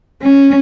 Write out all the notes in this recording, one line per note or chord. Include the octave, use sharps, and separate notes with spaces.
C#4